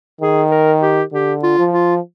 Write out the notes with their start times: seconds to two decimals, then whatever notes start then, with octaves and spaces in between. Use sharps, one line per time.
0.21 D#3 G#4
0.51 A#4
0.82 G4
1.12 D3 G4
1.43 F4
1.59 F3
1.73 F4